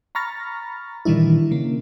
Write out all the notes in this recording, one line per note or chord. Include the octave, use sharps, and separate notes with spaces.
A#5 B5 C#6 F6 A6 A#6
A#2 D#3 E3 G3 D4 E4
C#3 A#3